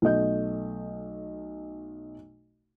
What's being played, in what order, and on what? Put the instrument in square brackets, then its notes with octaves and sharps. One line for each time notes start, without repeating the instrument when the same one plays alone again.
[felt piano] B1 A3 D#5 G6